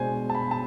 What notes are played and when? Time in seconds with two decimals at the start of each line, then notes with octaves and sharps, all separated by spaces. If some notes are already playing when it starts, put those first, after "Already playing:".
Already playing: B2 G#3 D4 C5 G#5
0.30 A5
0.35 B5
0.51 A5